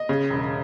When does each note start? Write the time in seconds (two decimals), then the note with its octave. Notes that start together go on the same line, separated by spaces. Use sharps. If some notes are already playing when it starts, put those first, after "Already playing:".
Already playing: D#5
0.09 C#3
0.30 E1